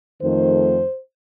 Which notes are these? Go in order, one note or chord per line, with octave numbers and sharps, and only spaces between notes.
F2 D#3 A3 C5